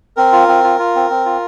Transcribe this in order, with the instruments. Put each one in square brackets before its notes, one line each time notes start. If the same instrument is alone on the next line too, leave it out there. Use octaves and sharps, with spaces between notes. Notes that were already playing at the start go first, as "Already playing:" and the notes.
[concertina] C4 A#4
F4
C4
F4
F4
C4
C4
F4